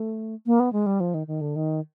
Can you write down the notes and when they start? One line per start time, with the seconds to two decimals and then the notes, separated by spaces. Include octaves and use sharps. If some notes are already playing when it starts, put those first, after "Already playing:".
Already playing: A3
0.46 A#3
0.60 B3
0.73 G#3
0.86 G3
1.00 F3
1.14 D#3
1.27 D#3
1.41 D3
1.56 D#3